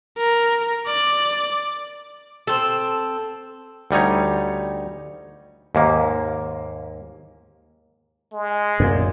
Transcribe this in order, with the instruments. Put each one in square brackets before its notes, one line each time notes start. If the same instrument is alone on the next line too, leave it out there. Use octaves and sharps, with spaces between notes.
[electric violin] A#4
D5
[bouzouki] C4 A4
[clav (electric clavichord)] D2 G3 D#4 C#5
D#2 G#2 A#3
[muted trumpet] G#3
[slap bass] F#2 A#2